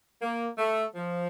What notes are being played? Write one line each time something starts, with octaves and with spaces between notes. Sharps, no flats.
A#3
A3
F3